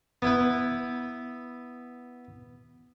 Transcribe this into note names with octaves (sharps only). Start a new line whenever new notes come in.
B3 E4 B4